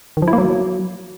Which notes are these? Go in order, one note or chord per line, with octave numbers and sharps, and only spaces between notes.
D#3
F3
E4
A#3
F#3